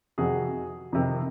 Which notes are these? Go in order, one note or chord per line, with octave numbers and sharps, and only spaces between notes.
F2 C3 D#3 F#4 G#4
F2 C3 D#3